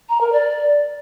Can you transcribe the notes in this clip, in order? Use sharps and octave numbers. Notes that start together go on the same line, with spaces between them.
A#5
A#4
D5